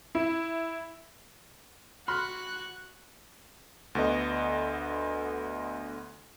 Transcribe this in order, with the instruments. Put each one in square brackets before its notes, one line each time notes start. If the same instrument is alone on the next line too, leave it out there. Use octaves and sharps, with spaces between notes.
[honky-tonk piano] E4
[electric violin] F#4 F#6 [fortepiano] B5 C6 F6
[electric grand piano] D2 D3 B3 D#5